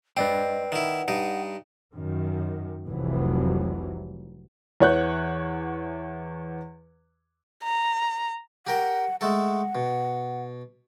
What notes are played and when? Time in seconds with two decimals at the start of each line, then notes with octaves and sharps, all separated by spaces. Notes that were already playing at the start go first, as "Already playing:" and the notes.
0.17 C4 B4 D5 D#5 G5
0.72 D#3 E4 F#5
1.08 G2 D#4
1.94 F#2 D#3
2.88 F1 C2 F2 C3 E3 F#3
4.80 E2 E3 C#5 F#5 F#6 G6
7.63 A#5
8.67 G4 A#4 F#5 G5
9.21 G#3 A3 A4 F#5
9.75 B2